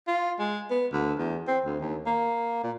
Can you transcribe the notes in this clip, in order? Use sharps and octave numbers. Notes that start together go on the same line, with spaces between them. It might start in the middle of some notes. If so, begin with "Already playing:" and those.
F4
G#3
B3
D2
E2
C4
D2
D#2
A#3
A#2